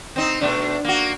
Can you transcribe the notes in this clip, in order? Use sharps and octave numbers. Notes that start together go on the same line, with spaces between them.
C4 D#4
B2 A3 D4
A#3 F#4